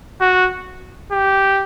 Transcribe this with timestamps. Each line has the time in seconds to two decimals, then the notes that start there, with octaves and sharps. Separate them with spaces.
0.21 F#4
1.12 G4